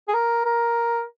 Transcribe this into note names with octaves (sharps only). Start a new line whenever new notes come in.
G#4
A#4
A#4